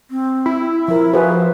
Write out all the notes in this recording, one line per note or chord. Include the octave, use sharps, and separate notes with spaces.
C4
E4
F3 A#4 E5
F3 F#4 G#4 B4